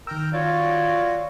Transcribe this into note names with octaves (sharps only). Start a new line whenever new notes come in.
D#3 A#4 G5 A#5 E6
F4 F#4 C#5 D5